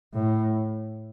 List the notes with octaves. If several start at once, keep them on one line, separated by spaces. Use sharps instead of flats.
A2